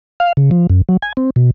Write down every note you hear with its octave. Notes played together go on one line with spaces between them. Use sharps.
F5
C#3
F3
F#2
F#3
G#5
C4
B2